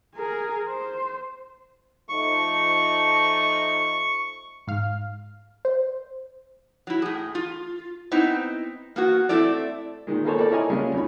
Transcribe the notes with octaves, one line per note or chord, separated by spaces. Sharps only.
G#4 A#4
C5
F3 A3 D#4 C#6
G#2 F5
C5
F#3 E4
A2 G#4
F4
B3 C4 D#4 E4
A#3 B3 F#4
A3 C4 E4 A4 D5
A#2 D#3 G#3
A#3 B3 G#4 A4 C5 C#5
F4 A4 A#4 D5
E4 A#4 C#5 D#5 G#5
A#2 C#3 G3 G#3 C#4 F4
F#2 C#4 D#4 B5